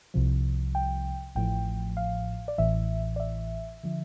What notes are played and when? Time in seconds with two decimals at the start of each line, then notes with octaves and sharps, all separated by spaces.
0.14 C2 C3 F3
0.75 G5
1.35 A1 A2 F3 G5
1.97 F5
2.48 D5
2.58 A1 A2 E3 E5
3.16 D5
3.20 E5
3.83 D3 F3